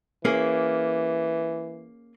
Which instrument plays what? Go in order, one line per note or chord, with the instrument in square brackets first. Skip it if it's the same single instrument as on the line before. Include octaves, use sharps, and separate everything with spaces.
[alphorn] E3 [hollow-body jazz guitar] A#3 C#4 G#4